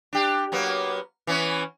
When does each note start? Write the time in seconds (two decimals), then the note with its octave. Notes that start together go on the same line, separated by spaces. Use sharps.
0.13 D4 G4
0.52 F#3 A#3 B3
1.27 E3 B3 C#4